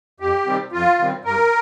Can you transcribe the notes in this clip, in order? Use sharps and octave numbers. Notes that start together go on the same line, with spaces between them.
F2 G4
C3 D#3 G3 C4
F2 F4
C3 D#3 G3 C4
G2 A#4